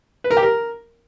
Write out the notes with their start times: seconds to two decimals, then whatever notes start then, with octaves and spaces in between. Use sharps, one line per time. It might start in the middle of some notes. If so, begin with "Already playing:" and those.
0.24 B4
0.31 A#4
0.37 G4
0.43 A#4